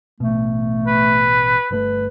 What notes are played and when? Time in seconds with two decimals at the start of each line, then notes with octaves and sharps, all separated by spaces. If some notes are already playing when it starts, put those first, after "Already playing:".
0.20 A1 B2 A3
0.87 B4
1.71 G1 C3 A3 B4